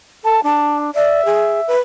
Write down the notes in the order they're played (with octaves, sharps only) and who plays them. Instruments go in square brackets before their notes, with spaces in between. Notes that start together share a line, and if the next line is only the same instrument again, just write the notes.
[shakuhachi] A4 [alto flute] A5
[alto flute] D4 [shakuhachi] A5
[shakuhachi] D5 [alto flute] E5
[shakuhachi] G#4
B4